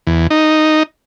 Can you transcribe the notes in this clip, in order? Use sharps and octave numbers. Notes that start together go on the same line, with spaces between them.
E2
D#4